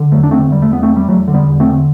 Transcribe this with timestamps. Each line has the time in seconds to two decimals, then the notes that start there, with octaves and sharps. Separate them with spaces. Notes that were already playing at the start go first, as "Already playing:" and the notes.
Already playing: D3
0.12 E2 F#3 A3
0.23 D4
0.31 D3 A3 C4
0.51 E2 G3
0.62 A3
0.70 E2 B3
0.83 A3 C4
0.90 E2
0.96 G3
1.08 E2 F#3 A3
1.28 D3
1.34 G3 B3
1.47 E2
1.60 A3 C4
1.66 D3